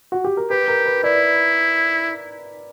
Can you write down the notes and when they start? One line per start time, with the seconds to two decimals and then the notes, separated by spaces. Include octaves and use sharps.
0.12 F#4
0.24 G4
0.37 A#4
0.50 G4 B4
0.68 A#4
0.86 B4
1.04 E4 D5